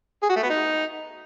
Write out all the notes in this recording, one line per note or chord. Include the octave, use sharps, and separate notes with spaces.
G#4
F#4
A3
B3
D#4